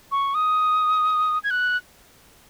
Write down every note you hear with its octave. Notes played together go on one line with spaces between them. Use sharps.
C#6
D#6
G#6
F#6